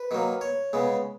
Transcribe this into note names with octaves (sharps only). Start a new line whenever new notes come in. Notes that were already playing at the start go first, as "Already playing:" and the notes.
Already playing: B4
D#3 F#3 A#3
C#5
C#3 G#3 B3